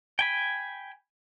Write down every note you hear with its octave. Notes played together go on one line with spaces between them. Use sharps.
G5 G#5 B5